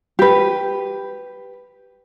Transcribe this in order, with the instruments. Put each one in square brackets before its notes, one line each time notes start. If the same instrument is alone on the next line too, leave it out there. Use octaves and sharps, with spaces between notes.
[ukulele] G4 B4